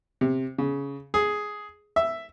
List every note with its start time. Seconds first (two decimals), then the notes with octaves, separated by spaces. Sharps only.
0.21 C3
0.58 C#3
1.14 G#4
1.96 E5